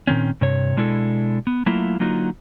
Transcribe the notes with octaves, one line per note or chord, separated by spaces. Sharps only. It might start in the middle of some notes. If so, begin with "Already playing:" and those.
A#2 D#3 C4 C#4
G2 C3 C#5
B2 G#3 D4 E4 F#4 A4
B3
F#3 A3 A#3 E4 F4
D3 F#3 A#3 D#4 F4 F#4